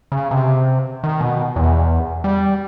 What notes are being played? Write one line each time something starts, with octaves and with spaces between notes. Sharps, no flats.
C#3
C3
D#3
B2
E2
G3